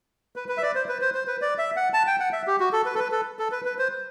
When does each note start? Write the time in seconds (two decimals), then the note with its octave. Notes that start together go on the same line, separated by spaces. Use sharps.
0.36 B4
0.49 B4
0.58 E5
0.62 D5
0.75 C5
0.89 B4
1.01 C5
1.14 C5
1.27 B4
1.42 D5
1.58 E5
1.76 F#5
1.94 A5
2.07 G5
2.20 F#5
2.33 E5
2.47 G4
2.60 F#4
2.72 A4
2.86 B4
2.95 A4
2.99 B4
3.12 A4
3.39 A4
3.52 B4
3.65 B4
3.79 C5